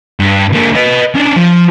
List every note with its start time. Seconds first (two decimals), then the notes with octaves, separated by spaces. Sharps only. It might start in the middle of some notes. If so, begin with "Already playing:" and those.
0.20 G2
0.52 D3 A#3
0.75 B4 D#5
1.15 C#4 D4
1.36 F3